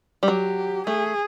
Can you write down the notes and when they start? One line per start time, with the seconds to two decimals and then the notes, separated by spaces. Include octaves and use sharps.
0.23 G3
0.27 F#3 G4
0.87 A3 G#4